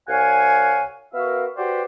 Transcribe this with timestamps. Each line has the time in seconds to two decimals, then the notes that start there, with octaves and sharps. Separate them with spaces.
0.09 C2 C#5 F5 F#5 G#5
1.14 B3 F#4 A#4 E5 F5
1.57 F#4 G4 B4 C5 D5 G5